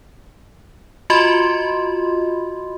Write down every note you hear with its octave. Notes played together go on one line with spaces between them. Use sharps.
F4 F#4 D#5 B5 C6